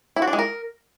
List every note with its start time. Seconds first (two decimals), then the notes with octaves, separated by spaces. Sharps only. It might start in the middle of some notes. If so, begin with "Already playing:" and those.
0.16 E4
0.22 F#4
0.28 D4
0.33 G#3
0.39 A#4